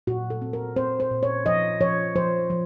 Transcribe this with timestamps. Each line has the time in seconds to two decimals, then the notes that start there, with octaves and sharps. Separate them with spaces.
0.07 A#2 F#4
0.30 A4
0.42 C4
0.53 A#4
0.76 C4 C5
1.00 C5
1.11 A#2
1.23 C#5
1.46 F3 D#5
1.81 F3 C#5
2.15 F3 C5
2.50 F3